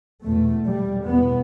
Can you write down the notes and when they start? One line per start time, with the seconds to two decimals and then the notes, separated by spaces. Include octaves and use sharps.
0.24 E2 B2 A3
0.65 G3
1.06 E2 B2 B3